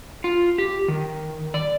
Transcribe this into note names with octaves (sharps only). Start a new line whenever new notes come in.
F4
G4
D#3
D5